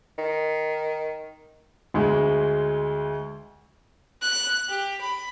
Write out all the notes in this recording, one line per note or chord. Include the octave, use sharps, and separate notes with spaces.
D#3
D2 G#3
F#6
G4
B5